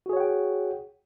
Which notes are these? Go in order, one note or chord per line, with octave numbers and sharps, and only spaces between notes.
F#4 G#4 C#5 F#5 G5